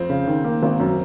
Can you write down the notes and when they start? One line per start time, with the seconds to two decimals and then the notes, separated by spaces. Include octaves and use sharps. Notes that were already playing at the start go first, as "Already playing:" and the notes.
Already playing: F2 C4
0.09 C#3
0.27 D#3
0.44 A#3
0.63 G#1
0.80 F#2